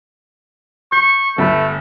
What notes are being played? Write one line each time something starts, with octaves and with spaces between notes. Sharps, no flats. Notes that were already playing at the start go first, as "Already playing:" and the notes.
C#6 G6
G1 A3 B5